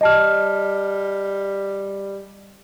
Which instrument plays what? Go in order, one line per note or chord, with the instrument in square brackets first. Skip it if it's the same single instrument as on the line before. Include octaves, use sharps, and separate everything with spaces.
[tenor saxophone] G3 [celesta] D#5 A5 F6